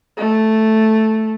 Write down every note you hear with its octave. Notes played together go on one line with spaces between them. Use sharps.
A3